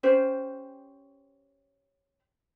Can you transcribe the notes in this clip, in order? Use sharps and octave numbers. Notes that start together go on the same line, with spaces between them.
C#4 G4 C5